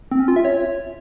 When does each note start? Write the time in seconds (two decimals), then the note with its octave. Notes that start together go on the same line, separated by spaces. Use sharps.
0.11 C4
0.20 C#4
0.28 F4
0.36 E5
0.45 C#5